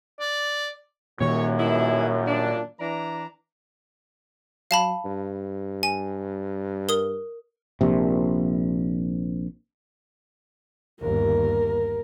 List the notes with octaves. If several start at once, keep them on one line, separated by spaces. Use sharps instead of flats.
D5
F#2 A#2 D#3 C#5
B2 E4 G#4
D4
E3 D4 A#5
F#3 F5 A5 B5
G2
G#5
A#4 D#6 G7
A#1 C3
G1 D#2 A#4